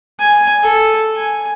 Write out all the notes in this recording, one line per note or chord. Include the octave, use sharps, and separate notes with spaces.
G#5
A4
G#5